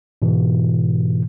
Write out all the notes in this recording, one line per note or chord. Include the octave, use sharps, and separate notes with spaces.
G#2 B2 E3